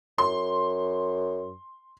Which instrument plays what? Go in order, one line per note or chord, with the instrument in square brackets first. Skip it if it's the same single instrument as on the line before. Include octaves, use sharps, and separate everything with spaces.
[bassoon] F#2 [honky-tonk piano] C6